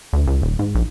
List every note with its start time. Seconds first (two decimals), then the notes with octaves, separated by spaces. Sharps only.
0.13 D2
0.27 C#2
0.42 D#1
0.59 G#2
0.75 A#1